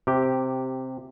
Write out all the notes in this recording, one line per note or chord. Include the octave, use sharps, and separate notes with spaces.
C3 G4